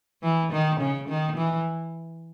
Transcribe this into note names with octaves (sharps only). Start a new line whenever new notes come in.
E3
D#3
C#3
D#3
E3